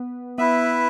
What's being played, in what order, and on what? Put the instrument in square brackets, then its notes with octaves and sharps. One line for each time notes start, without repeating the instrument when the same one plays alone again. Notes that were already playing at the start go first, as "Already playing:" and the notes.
Already playing: [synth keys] B3
[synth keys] B3 [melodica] E4 B4 E5